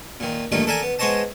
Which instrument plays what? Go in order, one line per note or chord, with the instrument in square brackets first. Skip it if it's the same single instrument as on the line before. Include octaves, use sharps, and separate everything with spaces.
[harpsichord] A#2 D#3
G2 A#2 D#3 A3 A#3 D#4
A4 A#4 D5 E5 G#5 A#5
B3
G#3 B3 C5 C#5 D#5 A5